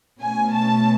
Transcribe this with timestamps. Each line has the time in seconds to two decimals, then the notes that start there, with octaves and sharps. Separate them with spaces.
0.21 B2 A3 C#4 G#5
0.54 A5